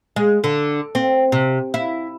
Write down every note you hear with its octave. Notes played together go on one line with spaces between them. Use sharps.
G#3
D3
C4
C3
E4